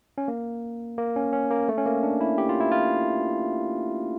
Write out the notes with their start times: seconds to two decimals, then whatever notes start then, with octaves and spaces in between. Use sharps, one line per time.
0.18 C#4
0.28 A#3
0.98 A#3
1.16 C#4
1.33 C#4
1.51 A#3
1.69 A3
1.78 C#4
1.86 A#3
2.03 D4
2.21 E4
2.38 G4
2.49 F4
2.60 E4
2.72 F4